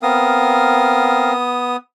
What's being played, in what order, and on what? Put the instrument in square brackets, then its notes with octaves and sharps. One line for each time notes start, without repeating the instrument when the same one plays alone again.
[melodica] B3 D#6 [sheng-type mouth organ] C4 A#4 F5